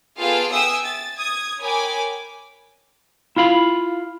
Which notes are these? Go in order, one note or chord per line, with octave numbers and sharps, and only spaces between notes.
B3 F4 G#4 A4 F5 G5
E5 G5 G#5 D#6 E6
A6
D#6 G#6
A#4 C#5 G5 G#5 B5 D6
E4 F4 F5 B5